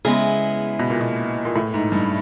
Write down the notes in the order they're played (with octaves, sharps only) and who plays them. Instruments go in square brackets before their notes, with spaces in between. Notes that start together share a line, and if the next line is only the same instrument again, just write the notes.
[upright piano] C#3 [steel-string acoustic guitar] G#3 B3 E4 G#4
[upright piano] B2
A#2
B2
A#2
A2
G#2
G2